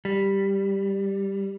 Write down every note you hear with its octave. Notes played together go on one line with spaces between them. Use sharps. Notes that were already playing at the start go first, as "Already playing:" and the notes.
G3